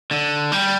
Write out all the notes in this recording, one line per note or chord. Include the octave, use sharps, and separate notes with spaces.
D3
G3